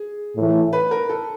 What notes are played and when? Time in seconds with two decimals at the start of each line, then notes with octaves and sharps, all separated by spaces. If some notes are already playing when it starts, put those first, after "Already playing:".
Already playing: G#4
0.35 A2 E3 A3
0.73 B4
0.91 A#4
1.09 A4